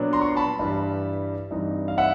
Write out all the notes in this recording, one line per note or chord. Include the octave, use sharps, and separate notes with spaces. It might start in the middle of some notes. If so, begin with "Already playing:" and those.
Already playing: A#2 F#3 B3 D4
A#5 C6
C#6
C6
A5 B5
G2 E3 G3
G2 E3 G3 C4 D#4
F5
E5 F#5